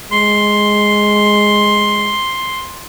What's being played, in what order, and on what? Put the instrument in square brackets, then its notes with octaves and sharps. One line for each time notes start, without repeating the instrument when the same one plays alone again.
[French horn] G#3 [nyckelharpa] C6